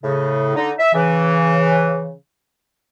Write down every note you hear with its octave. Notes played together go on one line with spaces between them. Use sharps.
A2 C#3
D3 D#4
E5
C#3 E3